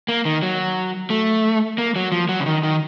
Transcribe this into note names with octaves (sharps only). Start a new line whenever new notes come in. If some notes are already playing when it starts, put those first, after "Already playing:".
A#3
D#3
F#3
A3
A#3
F#3
F3
F#3
C#3
D#3
D#3